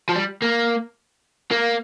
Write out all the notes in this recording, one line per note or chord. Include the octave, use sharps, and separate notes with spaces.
F3
G3
A#3
A#3